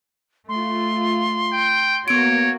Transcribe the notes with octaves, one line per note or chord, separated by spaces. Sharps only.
A3 F4 C6
G5
A#3 B3 F#4 C#5 D7